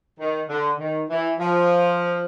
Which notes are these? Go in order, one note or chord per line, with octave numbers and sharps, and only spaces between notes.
D#3
D3
D#3
E3
F3